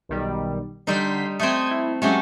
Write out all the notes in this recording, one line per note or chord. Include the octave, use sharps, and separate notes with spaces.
B1 D#3 G3
D3 G3 D#4 C6 B6
A3 C4 D#6 G6 G#6
E4
F#3 G#3 A3 C#4 G4 F#5